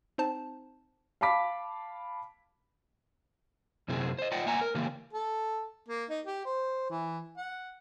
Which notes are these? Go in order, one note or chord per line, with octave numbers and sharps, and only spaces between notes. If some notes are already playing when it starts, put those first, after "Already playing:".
C4 D#4 C5 A5
F5 A5 B5 D6 B6
F#2 C3 F#3 C4 E4 G#4
C5 D#5
F4 D5 D#5 F#5 G5
A#3 E5 F#5 G#5 A#5
A#4
C#3 E3 A#3 G4
A4
A#3
D#4
G4
C5
E3
F#5